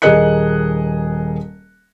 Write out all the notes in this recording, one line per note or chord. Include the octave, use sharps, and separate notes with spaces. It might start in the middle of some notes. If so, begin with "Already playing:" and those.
D#1 G#4 A#4 D#5 F#6 C#7